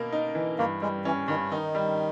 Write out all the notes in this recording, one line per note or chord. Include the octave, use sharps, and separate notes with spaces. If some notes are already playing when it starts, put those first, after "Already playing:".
Already playing: B2 A#3 A#4
D#4
E3
G2 A#3
G3 G#3
E3 C#4
G2 D#3
D#3 D#4
G3